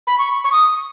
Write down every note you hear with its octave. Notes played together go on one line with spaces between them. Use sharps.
B5
C#6
C#6
D#6